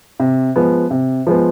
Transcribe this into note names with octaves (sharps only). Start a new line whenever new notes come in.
C3
F3 G#3 B3
C3
F3 G#3 B3